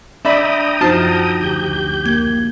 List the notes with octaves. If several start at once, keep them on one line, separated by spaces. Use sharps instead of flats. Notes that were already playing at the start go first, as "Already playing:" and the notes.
D4 D5 E5 G5 A#5 B5 D#6
F#2 F3 D#4 F4 F#4 C5 A5
D2 G4 G6
A#3 G#6